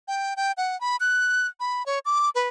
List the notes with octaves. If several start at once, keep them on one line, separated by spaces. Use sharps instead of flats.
G5
G5
F#5
B5
F#6
B5
C#5
D6
B4